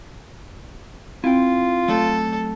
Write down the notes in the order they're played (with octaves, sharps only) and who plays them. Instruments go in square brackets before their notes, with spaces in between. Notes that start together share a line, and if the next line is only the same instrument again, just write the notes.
[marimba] C4 [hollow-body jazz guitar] E4 G5 [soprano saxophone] F4
[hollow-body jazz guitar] F#3 A3 [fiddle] A4